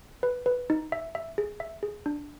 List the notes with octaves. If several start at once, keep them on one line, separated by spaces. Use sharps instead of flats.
B4
B4
D#4
E5
E5
G#4
E5
G#4
D4